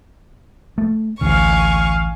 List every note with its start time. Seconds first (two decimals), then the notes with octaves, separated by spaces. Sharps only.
0.78 A3
1.21 A1 D2 F5 G#5 C#6